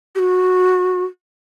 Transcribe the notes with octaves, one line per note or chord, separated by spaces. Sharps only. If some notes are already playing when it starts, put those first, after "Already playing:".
G4
F#4